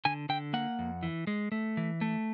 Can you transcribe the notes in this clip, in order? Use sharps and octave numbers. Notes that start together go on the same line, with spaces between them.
D3 G#5
D3 G5
A#3 F#5
F2
E3
G#3
A3
E3
A3